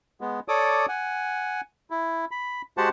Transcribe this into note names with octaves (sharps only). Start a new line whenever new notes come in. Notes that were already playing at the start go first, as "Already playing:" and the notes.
G#3 B3
A4 C#5 D5 D6 D#6
F#5 G#5
E4
B5
G#3 F#4 G4 C5 F#5 A5